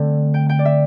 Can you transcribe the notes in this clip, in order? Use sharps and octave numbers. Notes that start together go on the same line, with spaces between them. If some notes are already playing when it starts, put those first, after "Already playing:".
Already playing: D3 A3 C4
G5
G5
D5
E5